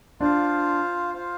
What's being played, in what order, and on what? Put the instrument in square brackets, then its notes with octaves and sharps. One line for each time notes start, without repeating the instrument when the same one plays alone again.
[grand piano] D4 [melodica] F4 C5 F5
[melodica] F4 C5 F5